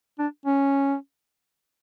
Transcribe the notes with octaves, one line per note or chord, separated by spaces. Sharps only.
D4
C#4